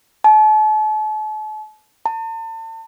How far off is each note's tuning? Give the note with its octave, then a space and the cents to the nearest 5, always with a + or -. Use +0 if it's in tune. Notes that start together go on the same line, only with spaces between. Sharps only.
A5 -40
A5 +40